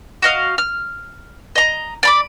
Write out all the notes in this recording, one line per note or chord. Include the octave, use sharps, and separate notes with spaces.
F#4 D#5 F5
F6
D#5 A#5
D5 B5 D6